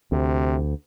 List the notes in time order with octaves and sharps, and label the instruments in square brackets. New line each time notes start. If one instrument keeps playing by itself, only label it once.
[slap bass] D2 [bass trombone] C3